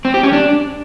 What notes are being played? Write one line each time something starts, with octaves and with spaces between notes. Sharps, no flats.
C4
G4
C#4
D4